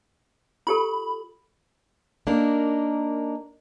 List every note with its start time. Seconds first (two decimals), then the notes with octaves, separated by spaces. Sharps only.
0.67 F4 G4 A4 B5
2.27 A#3 D4 D#4 A#4